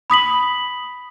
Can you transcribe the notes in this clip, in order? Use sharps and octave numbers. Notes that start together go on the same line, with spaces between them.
B5 D#6 B6 F#7